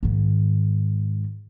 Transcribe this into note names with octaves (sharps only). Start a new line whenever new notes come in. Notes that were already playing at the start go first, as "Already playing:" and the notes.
G#2 D#3